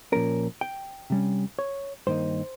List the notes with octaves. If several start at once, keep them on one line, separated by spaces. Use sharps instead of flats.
A#2 F3 A#3 C#4 A#4
G5
C3 G3 C#4
C#5
G2 D#3 A#3 D#4 C5